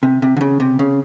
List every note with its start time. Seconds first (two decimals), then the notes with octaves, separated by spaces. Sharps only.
0.03 C3
0.22 C3
0.37 D3
0.41 C#3
0.60 C3
0.79 C#3